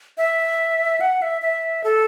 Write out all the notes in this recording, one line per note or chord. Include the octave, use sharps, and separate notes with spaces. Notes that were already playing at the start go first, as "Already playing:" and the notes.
E5
F#5
E5
E5
A4